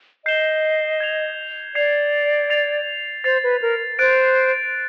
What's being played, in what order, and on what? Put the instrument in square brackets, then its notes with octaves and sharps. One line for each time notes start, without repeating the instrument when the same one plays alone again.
[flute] D#5 [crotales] G6 C7 E7 G7
[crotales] G#6 C7 F7
[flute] D5 [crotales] G#6 C7 F7
[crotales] A6 C7 F7
[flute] C5 [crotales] A6 C7 F7
[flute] B4
A#4
[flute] C5 [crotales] F#6 A6 D7